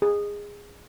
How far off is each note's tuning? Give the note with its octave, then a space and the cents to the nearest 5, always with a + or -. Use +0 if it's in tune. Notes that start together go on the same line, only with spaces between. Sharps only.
G#4 -15